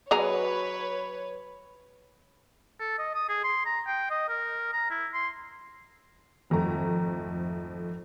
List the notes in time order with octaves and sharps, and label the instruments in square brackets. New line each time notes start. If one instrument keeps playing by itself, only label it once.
[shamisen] F#3 G#4 A#5 [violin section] B4 C#5
[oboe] A4
D#5
D#6
G#4
C6
A#5
G5
D#5
A#4
A#5
E4
C6
[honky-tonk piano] G#1 F2 A3 A#5